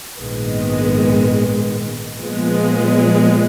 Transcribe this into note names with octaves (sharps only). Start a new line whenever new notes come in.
A#1 G#2 D#3 G#3 B3
A#2 F3 G#3 B3